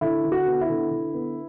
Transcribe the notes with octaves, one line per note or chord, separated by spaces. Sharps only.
D3 E4
D3
F#4
B3
E4
D3
D3
B3